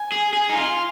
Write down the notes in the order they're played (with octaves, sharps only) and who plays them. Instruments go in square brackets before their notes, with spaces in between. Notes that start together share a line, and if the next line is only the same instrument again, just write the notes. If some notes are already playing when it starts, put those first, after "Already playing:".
Already playing: [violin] G#5
[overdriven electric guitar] G#4
G#4
D#4
F4